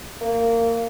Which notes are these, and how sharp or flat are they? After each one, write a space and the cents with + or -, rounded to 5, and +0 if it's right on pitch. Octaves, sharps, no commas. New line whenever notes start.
A#3 -20